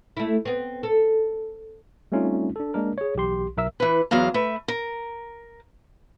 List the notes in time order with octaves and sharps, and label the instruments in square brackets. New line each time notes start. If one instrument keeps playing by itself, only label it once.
[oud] A3 E4
B3 C4
A4
[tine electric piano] G3 A3 C4 C#4 D#4 F4
D4 A4
G#3 A#3 D4 A#4
G#4 C#5
B1 E3 G4 C6
B1 A#4 E5 E6
[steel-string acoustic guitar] E3 B4
E2 F#3 F5 A#5
A3 B4 E5
A#4